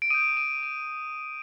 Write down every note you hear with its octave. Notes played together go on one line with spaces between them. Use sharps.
D7
D#6 G6 D#7
D#7
D#7